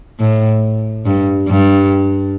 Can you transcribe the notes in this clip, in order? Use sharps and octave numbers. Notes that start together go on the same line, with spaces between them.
A2
G2
G2